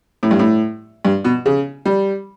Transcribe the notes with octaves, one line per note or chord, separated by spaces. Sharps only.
A2
G2
A2
G2
B2
C#3
G3